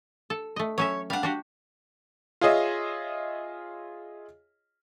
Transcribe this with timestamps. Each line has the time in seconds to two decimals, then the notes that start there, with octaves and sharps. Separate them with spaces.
0.30 A4
0.56 A3 D#5
0.78 F#3 C#4 C#5 E5
1.10 G3 D4 F5 F#5
1.23 D4 F#4 G4
2.41 F4 G#4 C#5 D#5 E5